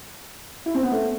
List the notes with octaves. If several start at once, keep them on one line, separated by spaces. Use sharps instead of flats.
E4
C4
B3
A3